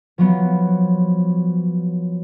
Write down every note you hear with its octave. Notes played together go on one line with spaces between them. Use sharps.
F3 F#3 B3